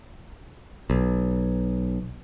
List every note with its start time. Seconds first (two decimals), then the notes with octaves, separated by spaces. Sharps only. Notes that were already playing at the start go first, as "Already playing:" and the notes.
0.90 B1